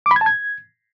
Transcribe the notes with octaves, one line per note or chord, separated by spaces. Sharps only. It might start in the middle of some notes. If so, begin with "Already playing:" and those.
D6
B5
G#6
A5
G#6